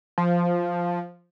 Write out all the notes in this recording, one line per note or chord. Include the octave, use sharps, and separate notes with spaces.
F3